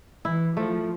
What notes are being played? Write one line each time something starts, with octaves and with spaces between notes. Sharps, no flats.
E3 E4
F3 A3